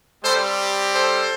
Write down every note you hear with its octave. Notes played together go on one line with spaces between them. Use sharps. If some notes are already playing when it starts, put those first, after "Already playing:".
G3 C4 G4 A4 C5
A4 C5